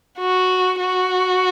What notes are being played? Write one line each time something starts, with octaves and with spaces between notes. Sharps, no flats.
F#4
F#4